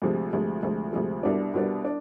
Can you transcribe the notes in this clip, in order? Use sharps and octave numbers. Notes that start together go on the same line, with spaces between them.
D2 C3 F3 G#3
D2 C3 F3 G#3
D2 C3 F3 G#3
D2 C3 F3 G#3
C2 B2 G3 B3 D4
C2 B2 G3 B3 D4
D4